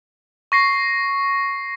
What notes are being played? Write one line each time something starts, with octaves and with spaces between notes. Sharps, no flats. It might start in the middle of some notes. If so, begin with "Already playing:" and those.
C#6 A#6 C7